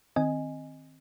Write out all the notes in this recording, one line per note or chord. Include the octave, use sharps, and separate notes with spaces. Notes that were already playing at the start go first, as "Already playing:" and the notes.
D#3 C4 D#5 G#5